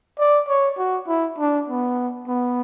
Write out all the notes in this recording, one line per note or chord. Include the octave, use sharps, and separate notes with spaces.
D5
C#5
F#4
E4
D4
B3
B3